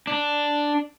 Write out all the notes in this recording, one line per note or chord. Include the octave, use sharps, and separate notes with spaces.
D4